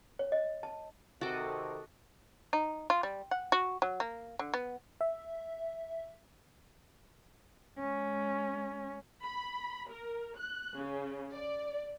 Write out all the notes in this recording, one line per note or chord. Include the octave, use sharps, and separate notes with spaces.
C#5
D#5
A5
C3 D#3 F#4 A4 D#5 D6
D#4
F4
G3
F#5
F#4
F#3
A#3
D3
B3
E5
G#3 C#4
B5
A#4
F#6
C#3
D5